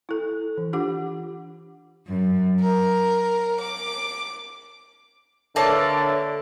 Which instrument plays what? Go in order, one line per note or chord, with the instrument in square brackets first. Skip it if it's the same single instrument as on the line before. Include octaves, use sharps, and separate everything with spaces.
[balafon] E4 A4
E3
D4 F4 G4 F#5 D6
[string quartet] F#2
A#4
D6
[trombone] D3 [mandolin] A#3 A5 [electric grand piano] A4 D5 [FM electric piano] B4 C#5 E5